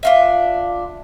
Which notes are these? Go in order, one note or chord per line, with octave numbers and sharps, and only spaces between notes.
D4 F4 E5